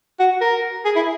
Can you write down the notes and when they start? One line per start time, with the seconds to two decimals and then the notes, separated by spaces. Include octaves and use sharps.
0.19 F#4
0.41 A#4
0.85 G#4
0.96 E4